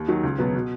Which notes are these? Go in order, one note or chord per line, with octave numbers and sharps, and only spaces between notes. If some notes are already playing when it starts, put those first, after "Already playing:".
Already playing: D#2
D#3 F#3
C#2
B2 F#3 B3
B2